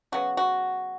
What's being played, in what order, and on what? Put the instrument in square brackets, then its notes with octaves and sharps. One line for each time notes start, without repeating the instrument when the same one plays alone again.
[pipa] C#3 F#3 B3 F#4
F#4